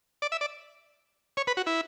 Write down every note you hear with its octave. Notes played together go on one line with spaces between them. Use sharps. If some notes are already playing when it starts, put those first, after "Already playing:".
D5
E5
D5
C#5
B4
F#4
E4